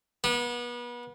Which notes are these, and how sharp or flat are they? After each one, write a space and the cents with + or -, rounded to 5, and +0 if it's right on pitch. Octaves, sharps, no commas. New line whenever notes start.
B3 -35